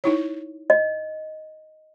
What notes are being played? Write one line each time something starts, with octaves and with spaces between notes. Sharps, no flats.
D#4 E4 C#5
D#5